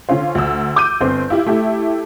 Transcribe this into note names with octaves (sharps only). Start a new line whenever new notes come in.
D3 C#4 F4 C5
D2 E6
D6 G6 D#7
G1 C4 C5
E4 F4 G4 E5
A3 E4 G4 E5